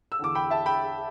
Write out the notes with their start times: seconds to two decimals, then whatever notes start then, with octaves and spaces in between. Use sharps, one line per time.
0.12 E6
0.19 E2 D3 D6
0.35 G5 B5
0.50 E5 A5
0.66 G5 B5